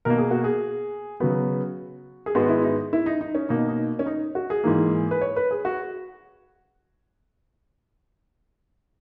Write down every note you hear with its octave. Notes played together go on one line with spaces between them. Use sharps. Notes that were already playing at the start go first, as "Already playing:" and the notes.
B2 A#3 A#4
G#4
F#4
G#4
C#3 F#3 B3 F#4
G#4
G#2 D#3 G#3 B3 F#4
E4
D#4
E4
D#4
D#4
C#4
B2 A#3 D#4
D#4
C#4
D#4
F#4
G#4
G#2 E3 A#3
B4
C#5
B4
G#4
F#4